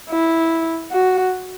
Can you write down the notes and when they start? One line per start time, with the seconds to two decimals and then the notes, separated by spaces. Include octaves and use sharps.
0.10 E4
0.92 F#4